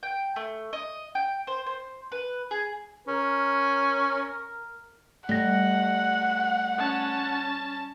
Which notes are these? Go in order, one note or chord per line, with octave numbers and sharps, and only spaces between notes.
G5
A3
D#5
G5
C5
C5
B4
G#4
C#4 A#4
G3 A3 F#5 A#6
C#4 A5